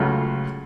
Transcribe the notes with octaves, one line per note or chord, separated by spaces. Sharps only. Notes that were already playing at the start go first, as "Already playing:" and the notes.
Already playing: C#2 C#3 F#3 A3 F4